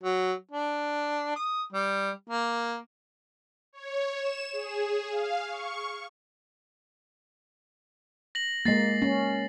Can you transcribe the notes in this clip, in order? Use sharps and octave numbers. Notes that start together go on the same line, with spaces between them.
F#3
D4
D#6
G3
A#3
C#5
E7
G#4
F5
C#6
A#6 F#7
G#3 A#3 A6 C7
C#4